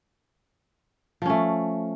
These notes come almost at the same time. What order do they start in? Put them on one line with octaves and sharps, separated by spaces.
F3 C#4 A3